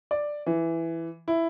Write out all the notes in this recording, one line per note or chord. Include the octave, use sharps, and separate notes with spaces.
D5
E3
E4